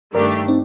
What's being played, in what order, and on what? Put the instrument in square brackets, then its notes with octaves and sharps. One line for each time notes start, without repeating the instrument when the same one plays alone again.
[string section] G2 D#3 A3 D4 G4 [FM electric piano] A#4 D5
[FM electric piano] C4 D#4